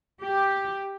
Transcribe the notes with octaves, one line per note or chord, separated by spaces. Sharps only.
G4